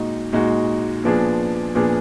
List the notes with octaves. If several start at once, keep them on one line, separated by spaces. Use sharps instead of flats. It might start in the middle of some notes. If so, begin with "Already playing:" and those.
Already playing: A#2 G#3 D#4 F#4
A#2 G#3 D#4 F#4
A#2 F3 B3 D4 G#4
A#2 F3 B3 D4 G#4